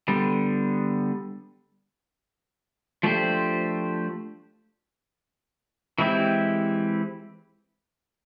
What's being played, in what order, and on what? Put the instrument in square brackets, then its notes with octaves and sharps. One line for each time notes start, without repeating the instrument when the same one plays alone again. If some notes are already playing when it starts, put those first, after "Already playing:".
[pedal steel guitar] D3 G3 B3
F3 A3 D4 G4 C5
E3 G#3 C4 E4 G4